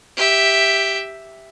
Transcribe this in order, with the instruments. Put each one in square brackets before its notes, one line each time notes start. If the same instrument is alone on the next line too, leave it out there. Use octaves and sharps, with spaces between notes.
[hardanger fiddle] G4 E5